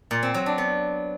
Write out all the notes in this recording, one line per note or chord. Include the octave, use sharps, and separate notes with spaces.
A#2
C4
F#3
D4
B3